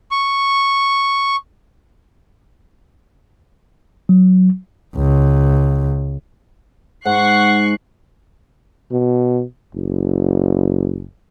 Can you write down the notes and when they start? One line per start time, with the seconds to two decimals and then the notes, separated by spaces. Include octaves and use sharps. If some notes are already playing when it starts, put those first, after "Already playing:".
0.11 C#6
4.09 F#3
4.96 C#2
7.05 G#2 F#5 C#6 F#6 C7
8.92 B2
9.75 F#1